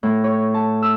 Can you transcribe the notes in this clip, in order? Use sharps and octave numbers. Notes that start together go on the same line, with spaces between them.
A2
C#5
A5
E6